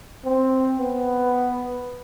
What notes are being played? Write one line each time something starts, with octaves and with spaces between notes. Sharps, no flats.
C4
B3